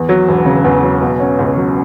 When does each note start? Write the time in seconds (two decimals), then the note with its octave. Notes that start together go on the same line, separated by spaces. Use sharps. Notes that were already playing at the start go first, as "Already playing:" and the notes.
Already playing: E2
0.09 F#3
0.28 E1
0.45 C#3
0.64 E2
0.83 F#3
1.01 B2
1.20 C#4
1.39 C#2
1.57 F#3